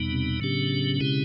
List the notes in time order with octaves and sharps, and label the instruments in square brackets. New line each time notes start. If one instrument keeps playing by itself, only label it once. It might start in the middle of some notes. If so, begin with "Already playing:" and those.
Already playing: [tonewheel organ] E2 B2 G3 B3 D#4
[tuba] C3
[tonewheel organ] A2 F#3 B3 D4 G4 [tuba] C#3
[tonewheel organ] B2 G#3 C4 E4 G4